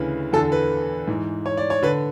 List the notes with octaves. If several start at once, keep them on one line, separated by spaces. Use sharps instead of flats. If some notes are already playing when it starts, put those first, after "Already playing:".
Already playing: D2 C#3 E3 B4
E2 D3 A4
B4
G#2 E3
C#5
D5
C#5
D3 B4